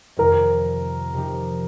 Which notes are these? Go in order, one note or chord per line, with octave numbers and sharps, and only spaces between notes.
F2 C3 D#3 A#4
C3 F3 D#4 G4